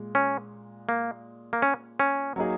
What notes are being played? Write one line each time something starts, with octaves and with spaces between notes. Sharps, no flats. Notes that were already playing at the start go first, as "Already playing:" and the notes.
Already playing: A#2 G#3
C#4
A#3
A#3
C#4
C#4
F#3 A#3 D#4 G#4